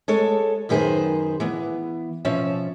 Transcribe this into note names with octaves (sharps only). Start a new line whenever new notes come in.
G#3 A4 C#5
F#2 D#3 E4 G#4 B4 C5
E3 B3
B2 F3 C#4 E5